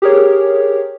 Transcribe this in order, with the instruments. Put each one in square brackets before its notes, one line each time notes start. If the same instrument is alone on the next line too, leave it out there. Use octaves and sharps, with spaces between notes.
[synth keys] G4 G#4 A#4 C#5